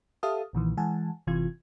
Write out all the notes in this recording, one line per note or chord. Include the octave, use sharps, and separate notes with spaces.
G4 A4 E5 F5 A5 D#6
B1 A#2 D#3 E3
E3 G#3 F#5 G#5 A5
G1 C3 E3 F4 G#6